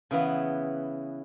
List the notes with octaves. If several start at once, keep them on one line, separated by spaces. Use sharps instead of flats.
C#3 E3 B3